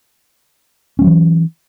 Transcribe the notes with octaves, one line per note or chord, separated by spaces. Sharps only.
E3 F#3 G#3 C#4